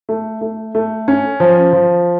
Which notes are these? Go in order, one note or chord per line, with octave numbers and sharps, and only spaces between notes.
A3
A3
A3
C#4
F3
F3